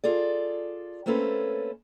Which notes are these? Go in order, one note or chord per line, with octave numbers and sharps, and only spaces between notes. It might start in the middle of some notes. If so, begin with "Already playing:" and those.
F4 G#4 A4 D5
A3 A#3 C4 C#4 A4 B4